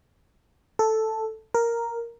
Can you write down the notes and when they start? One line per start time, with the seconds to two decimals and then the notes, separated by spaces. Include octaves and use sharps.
0.79 A4
1.54 A#4